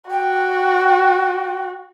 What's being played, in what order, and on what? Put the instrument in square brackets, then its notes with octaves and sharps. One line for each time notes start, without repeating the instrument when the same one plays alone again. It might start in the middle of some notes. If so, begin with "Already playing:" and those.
[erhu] F#4 [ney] G5